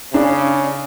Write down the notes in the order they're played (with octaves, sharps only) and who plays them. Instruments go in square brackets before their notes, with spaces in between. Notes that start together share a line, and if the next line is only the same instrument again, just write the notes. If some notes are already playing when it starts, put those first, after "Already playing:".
[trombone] C#3 [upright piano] D4